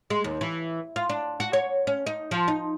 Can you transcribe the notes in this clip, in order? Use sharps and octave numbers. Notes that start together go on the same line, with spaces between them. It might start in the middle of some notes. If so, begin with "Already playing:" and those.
G#3
D#2
E3
F4
D4
F#4
C#5
C#4
D#4
F3
D#4